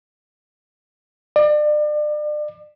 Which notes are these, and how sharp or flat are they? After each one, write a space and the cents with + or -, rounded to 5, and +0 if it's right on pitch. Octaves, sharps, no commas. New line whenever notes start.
D5 +35